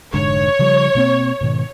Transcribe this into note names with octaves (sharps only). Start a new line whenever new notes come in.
F1 G#2 D3 C#5
C#3 F3 G3
B2 A#3 C4
G#2 B2 D#3